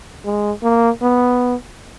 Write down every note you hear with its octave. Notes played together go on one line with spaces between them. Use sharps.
G#3
A#3
B3